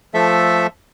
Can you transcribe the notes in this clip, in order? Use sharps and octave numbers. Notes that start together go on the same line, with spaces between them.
F3 A3 A4 E5